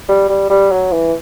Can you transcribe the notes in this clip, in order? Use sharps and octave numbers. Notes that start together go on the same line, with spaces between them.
G3
G3
G3
F#3
E3